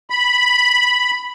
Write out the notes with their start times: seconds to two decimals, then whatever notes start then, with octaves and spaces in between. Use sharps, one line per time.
0.10 B5